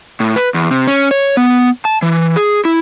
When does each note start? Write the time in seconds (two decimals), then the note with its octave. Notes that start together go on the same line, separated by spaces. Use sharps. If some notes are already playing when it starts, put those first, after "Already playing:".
0.20 A2
0.36 B4
0.54 E2
0.71 C3
0.87 C#4
1.11 C#5
1.37 B3
1.85 A5
2.02 E3
2.36 G#4
2.65 E4